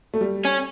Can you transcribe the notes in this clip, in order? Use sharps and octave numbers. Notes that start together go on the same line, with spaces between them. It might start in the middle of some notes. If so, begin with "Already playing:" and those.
A3
G3
C#4